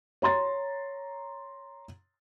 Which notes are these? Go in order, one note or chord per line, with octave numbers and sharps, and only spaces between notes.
C#5 A#5 C6 A6